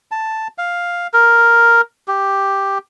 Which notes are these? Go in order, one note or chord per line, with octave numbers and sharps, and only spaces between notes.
A5
F5
A#4
G4